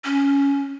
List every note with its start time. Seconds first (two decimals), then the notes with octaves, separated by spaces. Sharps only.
0.04 C#4